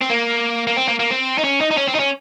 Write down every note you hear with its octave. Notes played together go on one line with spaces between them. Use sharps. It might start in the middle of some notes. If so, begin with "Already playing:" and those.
C4
A#3
A#3
C4
A#3
A#3
C4
D#4
C#4
D#4
D#4
C#4
C4
D#4
C#4